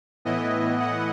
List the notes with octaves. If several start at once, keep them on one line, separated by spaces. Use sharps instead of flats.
A2 E3 B3 E4 D#5
F#5